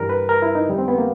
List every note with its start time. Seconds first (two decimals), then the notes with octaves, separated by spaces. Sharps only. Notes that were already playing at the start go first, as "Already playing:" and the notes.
Already playing: G2 E3 G3 A#4
0.09 B4
0.29 A#4
0.42 E4
0.55 D#4
0.68 F2 D3 G3
0.78 C4
0.88 B3
0.98 A#3